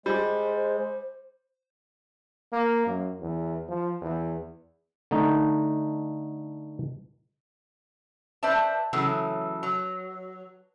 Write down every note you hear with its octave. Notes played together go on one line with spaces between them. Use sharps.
G3 G#3 C5
A#3
F#2
E2
F3
E2
D3 A3 D#4
B4 C5 D5 E5 A5
C#3 E3 F#3 A3
F#3